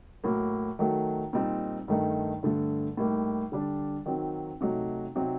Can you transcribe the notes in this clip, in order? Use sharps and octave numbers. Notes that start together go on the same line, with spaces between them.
A2 F#3 A#3
D#3 F#3 A3
A#2 G3 C4 D#4
G2 D#3 A3 D#4
G2 D3 A3
A2 G3 A#3 D#4
D3 G3 D4
D#3 F#3 C4 D#4
C3 F#3 A3 D#4
C3 F#3 C4 D#4